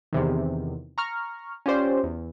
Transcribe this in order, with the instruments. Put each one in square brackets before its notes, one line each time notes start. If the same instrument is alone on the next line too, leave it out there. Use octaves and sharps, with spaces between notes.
[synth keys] E2 C3 D#3
A#5 C#6 F6
C#4 F4 G4 C5 D5
E2